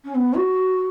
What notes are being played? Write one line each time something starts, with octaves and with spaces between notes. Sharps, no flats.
C#4
B3
F#4